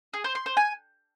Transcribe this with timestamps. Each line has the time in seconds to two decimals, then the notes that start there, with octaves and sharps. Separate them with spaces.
0.14 G#4
0.24 C5
0.35 C6
0.46 C5
0.57 G#5